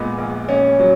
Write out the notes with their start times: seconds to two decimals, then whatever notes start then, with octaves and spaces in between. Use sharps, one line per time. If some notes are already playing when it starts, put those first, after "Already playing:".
Already playing: A#2 G#3 B3
0.18 A#1
0.48 A#1 C#4
0.79 F#3